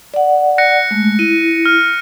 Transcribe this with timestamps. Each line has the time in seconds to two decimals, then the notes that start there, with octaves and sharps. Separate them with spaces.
0.14 D5 F#5
0.58 F#6 A#6 C#7
0.91 G#3 A3
1.19 E4 D#7
1.66 F6